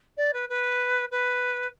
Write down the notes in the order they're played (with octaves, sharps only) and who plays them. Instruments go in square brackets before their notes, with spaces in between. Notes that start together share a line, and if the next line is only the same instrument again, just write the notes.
[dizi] D5
B4
B4
B4